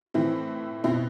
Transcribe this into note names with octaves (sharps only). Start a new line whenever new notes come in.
A2 E3 C4 E4
B2 C4 E4